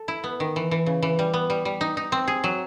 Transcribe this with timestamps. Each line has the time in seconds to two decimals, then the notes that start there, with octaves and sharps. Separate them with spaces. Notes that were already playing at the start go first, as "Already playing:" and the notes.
Already playing: A4
0.08 E4
0.24 B3
0.40 D#3
0.56 E3
0.71 E3
0.86 C#3
1.03 E3
1.19 G3
1.34 B3
1.50 G3
1.65 G3
1.81 D#4
1.97 D#4
2.12 C4
2.28 G#4
2.44 F#3